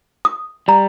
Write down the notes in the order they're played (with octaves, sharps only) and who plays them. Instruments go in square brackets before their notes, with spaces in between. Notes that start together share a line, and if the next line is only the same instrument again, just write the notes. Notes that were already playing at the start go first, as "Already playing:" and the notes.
[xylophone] D#6
[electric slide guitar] G3 [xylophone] A#5